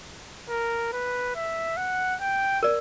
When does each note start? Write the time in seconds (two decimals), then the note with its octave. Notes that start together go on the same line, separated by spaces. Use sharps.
0.50 A#4
0.93 B4
1.35 E5
1.77 F#5
2.21 G5
2.63 A#4 D5